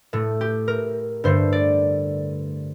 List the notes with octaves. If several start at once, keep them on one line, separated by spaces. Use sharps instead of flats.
A2 A3
G4
A#4
G2 D3 A3 C5
D5